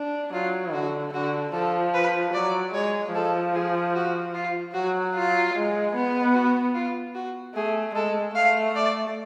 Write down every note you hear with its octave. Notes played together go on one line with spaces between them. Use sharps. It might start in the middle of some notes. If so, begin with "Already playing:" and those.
Already playing: D4
F#3 F4
D3 F#4
D3 F#4
F3 A4
B4
F#3 D5
G#3 C#5
F3 A4
G#4
F#4
F4
F#3 F#4
F4
G#3
B3
F#4
F4
F#4
A3 G#4
G#3 A4
A3 F5
D5